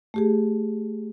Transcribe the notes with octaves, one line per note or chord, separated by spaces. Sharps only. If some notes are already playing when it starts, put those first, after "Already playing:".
A3 G4 G#4